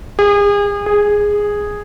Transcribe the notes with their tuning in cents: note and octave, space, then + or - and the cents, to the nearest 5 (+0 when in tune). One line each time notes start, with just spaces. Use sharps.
G#4 -35
G#4 -5